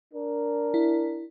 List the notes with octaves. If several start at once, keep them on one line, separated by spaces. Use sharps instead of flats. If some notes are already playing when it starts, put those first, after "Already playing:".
D4 A#4
E4